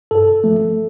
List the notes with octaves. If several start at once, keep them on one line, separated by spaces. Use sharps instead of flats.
G2 A4
F3 A3